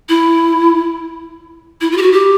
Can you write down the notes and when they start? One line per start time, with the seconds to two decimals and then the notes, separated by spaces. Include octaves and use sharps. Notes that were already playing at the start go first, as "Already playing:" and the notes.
0.09 E4
1.81 E4
1.92 F4
1.97 G4
2.02 F#4
2.12 G4